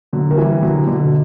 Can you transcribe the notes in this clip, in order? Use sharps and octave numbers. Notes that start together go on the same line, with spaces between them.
D3 F#3
A#3
E3 G3
D3 F#3
B2 D3